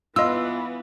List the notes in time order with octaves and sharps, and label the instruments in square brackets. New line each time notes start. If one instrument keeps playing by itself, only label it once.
[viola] E3 B3 [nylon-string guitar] F4 [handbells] D#5 E6